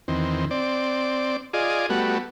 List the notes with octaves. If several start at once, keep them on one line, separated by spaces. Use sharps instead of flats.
E2 D#3 C4
C4 D5
F4 G#4 D5 D#5
G3 A3 B3 F#4